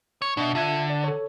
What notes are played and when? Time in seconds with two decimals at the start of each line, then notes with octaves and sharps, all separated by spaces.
0.22 C#5
0.37 B2 D4 E5
0.55 D3 F4 E5 G#6
0.90 D5
1.04 A4 C#5